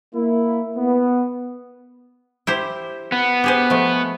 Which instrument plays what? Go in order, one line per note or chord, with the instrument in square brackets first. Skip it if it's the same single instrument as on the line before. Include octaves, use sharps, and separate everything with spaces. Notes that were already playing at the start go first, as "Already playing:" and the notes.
[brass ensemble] A#3 E4
B3
[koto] E4 G4 C5
[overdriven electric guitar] B3
[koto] G4 G#4 C5
F3 G#3 A3